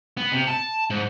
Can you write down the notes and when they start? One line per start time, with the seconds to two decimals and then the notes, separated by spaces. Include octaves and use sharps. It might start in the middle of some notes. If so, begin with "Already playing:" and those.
0.17 B3
0.32 C3
0.47 A5
0.90 G#2